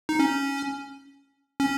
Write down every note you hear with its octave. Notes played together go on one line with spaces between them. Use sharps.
D#4
C#4
C#4